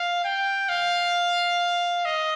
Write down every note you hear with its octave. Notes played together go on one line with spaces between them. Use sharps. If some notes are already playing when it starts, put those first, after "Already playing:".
Already playing: F5
G5
F5
D#5